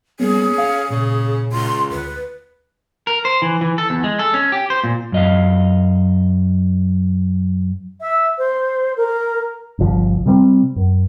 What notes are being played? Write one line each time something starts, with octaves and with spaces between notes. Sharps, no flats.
G3 A#3 B3 C#4 G#4
F5
A#2 C#3
C#2 C6
D2 B4
A#4
C5
E3
E3
A4
E2
G#3
A4
C#4
G4
C5
A#2
F#2 D#5 F5
E5
C5
A#4
G1 C2 F3
C3 G3 A3 C4
F#2